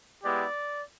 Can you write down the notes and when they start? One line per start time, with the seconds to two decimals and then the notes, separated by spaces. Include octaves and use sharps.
0.24 G#3 B3 E4 G4 D5